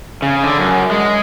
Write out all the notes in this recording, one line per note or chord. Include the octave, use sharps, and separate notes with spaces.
C#3
D3
F#2
G#3